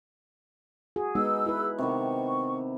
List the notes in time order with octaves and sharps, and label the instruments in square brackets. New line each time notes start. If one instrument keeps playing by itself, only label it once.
[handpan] F#4 G#4
[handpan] G#3 B3 D#4 [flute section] G#4 E6
[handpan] E4 B4
[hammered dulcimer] C3 D#3 B3 [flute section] C#6